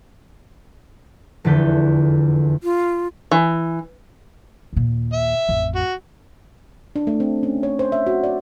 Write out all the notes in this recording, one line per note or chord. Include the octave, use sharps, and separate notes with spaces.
F1 E2 D3 A4 B4 G6
F4
E3
D#2 A#2
E5
A1 F2
F#4
D4
A3
C4
C#4
C#5
C5
E5
F#4
D5